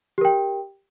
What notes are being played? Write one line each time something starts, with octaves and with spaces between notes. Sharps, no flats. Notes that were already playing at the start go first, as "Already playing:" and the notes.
G4 A#4 G5